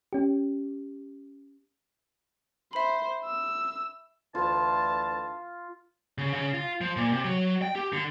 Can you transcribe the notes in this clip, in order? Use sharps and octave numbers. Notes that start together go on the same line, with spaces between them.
C#4 G4
C5 E5 B5
E6
D2 E3 F4 A5
C#3
C#3
F4
F3
A#2
C3
F#3
G5
G4
D3